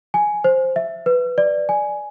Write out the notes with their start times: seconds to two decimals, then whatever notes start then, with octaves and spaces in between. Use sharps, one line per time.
0.14 G#5
0.44 C5
0.76 E5
1.06 B4
1.38 D5
1.69 G#5